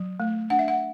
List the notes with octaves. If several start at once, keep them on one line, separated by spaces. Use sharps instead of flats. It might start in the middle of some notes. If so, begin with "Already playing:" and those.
Already playing: F#3
A3
D4 F#5
E5
F#5